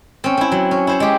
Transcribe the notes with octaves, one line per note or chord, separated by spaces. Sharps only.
C4 C#4
C4 E4
F#3
C#4
E4 C5 C#5
G#3 G4